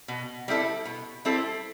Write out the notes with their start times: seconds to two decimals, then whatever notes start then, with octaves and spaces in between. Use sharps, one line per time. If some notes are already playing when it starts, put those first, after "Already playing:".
0.08 B2
0.48 G3 C4 E4 A4
0.85 B2
1.25 G3 C4 E4 A4